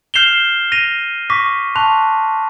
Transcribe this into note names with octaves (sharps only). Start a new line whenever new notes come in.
F6 G6 C7 E7 F7 G7
A#6 D#7 F7
C#6 D6 A#6 B6
A5 C6 C#6 F#6 F7